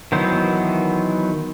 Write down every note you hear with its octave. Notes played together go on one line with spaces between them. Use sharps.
D#3 E3 F#3 B3 C5